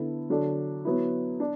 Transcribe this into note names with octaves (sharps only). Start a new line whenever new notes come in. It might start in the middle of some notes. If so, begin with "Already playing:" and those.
Already playing: D3 B3 E4 A4
D3 F#3 D4 A4
F#3 B3 E4
D4